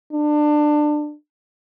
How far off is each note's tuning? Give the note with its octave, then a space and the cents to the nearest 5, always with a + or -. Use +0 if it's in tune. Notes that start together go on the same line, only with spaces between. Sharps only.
D4 +25